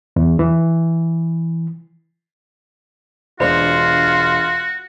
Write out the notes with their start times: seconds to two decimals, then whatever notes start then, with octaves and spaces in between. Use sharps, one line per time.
0.16 E2
0.39 E3
3.40 E1 D4 F4 F#4 C5 C6